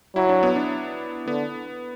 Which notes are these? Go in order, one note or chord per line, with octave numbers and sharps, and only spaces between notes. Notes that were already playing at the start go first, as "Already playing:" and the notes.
F#3 E4
D4
B3
D4
D3 B3